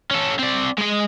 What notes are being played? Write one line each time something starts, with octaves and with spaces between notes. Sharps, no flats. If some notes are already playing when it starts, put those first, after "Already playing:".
C#4 A4
C4 D5
G#3 D#5